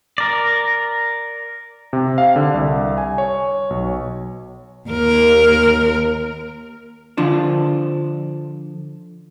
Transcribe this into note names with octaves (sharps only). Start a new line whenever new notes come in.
A#4 D5
C3
F5
D3
C2
G#5
C#5
B1
D#2 A#4
D3 F3 D4